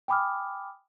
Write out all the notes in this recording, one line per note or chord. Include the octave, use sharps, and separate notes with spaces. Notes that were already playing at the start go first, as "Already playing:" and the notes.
G5 G#5 B5 D6 D#6 F6